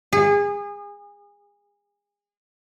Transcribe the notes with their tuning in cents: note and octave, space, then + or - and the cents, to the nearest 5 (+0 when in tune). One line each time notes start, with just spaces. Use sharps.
G#4 -30